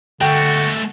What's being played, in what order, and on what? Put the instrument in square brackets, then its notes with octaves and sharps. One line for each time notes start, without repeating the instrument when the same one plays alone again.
[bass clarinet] D3 [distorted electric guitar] G#3 A3 [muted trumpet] F#4 [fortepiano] G5